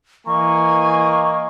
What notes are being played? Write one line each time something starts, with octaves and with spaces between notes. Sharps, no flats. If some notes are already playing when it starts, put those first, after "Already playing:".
E3 A#3 D#5 G#5 A#5 C#6